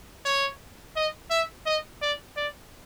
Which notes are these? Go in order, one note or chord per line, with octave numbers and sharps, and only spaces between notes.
C#5
D#5
E5
D#5
D5
D5